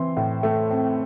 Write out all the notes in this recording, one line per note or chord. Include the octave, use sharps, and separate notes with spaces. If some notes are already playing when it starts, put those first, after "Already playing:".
Already playing: E3 C4 C6
A2
A3
C4